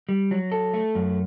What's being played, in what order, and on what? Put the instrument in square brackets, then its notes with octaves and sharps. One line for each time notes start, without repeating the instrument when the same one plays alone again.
[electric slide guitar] G3
F#3
A4
A3
F#2